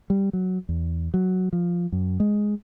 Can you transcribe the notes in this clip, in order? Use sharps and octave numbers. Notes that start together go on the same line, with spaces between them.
G3
F#3
E2
F#3
F3
F#2
G#3